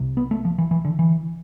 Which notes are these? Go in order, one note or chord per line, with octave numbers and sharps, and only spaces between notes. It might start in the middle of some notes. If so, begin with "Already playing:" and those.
Already playing: C2 C3
B3
A3
F3
E3
E3
D3
E3